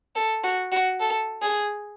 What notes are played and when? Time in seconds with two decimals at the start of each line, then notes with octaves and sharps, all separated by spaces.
0.16 A4
0.44 F#4
0.72 F#4
1.00 A4
1.42 G#4